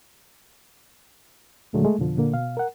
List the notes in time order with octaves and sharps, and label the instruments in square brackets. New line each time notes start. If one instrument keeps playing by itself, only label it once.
[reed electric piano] D#2 A#2 D3 F#3 G#3 A3
G#3 A3
F2 B2 D3 F3
A#2 D3 A#3
B2 F5
A#4 F#5